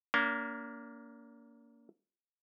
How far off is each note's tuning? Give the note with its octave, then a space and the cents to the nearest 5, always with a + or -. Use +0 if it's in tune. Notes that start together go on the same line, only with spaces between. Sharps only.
A#3 +0 D4 -45